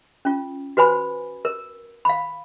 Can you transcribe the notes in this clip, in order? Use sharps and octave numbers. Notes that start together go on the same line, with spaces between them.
C#4 F4
F#4 B4 C5 G#5 B5
A#4
F5 B5